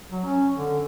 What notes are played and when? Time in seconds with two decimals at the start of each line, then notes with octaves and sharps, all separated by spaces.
0.11 F#3
0.25 C#4
0.55 D3